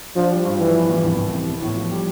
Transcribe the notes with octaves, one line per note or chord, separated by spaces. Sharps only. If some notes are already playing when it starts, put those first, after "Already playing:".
F3 D4
G3
G2
E3 F3
E2
E2
C2
C2
C3
B3
A2
F3
G3